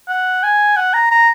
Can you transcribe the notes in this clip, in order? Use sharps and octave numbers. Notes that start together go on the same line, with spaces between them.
F#5
G#5
F#5
A#5
A#5